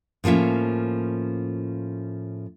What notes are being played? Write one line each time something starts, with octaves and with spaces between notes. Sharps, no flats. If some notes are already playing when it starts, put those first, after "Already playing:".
A2 F3 A#3 C#4 E5